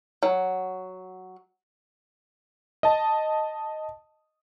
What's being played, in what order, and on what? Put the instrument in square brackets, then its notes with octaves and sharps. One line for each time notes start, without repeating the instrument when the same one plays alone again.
[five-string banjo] F#3
[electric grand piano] D#5 A5